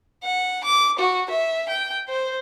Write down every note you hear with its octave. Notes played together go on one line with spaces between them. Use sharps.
F#5
D6
F#4
E5
G5
C5